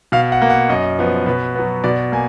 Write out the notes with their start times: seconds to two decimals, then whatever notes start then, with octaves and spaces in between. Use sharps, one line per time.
0.12 B2 F5
0.32 F#5
0.42 A#3
0.50 F#5
0.69 F#2 D#5
0.99 F3 B3
1.26 B2 B4
1.55 F#3 B3
1.84 B2 D5
2.12 A#3 G#5